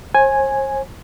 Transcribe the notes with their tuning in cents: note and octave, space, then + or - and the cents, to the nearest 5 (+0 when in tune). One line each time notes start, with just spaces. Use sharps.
C5 +45 G#5 +0